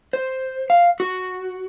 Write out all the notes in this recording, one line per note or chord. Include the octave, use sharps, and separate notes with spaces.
C5
F5
F#4